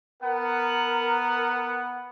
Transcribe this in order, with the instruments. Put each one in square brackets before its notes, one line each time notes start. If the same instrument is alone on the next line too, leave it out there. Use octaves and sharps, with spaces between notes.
[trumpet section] B3 F#5 [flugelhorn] A#4